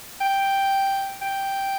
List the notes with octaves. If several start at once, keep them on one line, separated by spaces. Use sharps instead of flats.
G5
G5